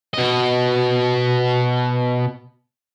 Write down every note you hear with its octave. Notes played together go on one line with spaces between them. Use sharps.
B2 D#5